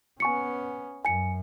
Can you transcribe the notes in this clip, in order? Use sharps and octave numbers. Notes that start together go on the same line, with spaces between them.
B3 C#4 G#5 C#6 C#7
F#2 G#5 C#7